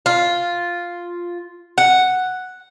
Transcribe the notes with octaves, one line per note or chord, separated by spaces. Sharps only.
F4
F#5